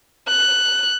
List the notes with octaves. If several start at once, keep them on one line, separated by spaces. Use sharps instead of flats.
F#6